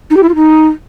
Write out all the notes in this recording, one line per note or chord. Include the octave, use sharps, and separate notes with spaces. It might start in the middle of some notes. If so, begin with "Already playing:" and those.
D#4
G4
E4
F4
D#4